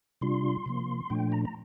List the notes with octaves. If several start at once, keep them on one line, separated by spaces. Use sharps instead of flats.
C3 G3 D4 F4 C6
C3 F3 A#3
A#2 F3 A3 D4 G5
A#5
A#5